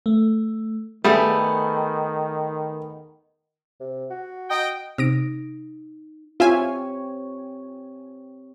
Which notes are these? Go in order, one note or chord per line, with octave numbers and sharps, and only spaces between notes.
A3
D#3 G3 A3 B3 G#4
C3
F#4
D#5 G5
C3 D#4 A#6 D7
C4 F4 G4 C#5 E5 G#5